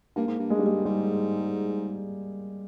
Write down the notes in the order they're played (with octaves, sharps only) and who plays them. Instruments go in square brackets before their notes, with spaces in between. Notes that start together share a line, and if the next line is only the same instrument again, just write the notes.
[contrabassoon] G2 [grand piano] A#3
[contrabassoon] G#2
G2
[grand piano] G#3
G3
G#3
[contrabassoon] G#2 [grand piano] G3